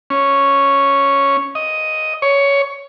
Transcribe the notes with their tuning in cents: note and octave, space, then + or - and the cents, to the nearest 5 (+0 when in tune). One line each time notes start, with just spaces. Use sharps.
C#4 +0
D#5 +5
C#5 +15